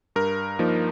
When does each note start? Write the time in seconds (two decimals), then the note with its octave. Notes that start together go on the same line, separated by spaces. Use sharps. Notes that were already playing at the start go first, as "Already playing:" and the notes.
0.16 G2 A#4
0.59 F3 A#3 D#4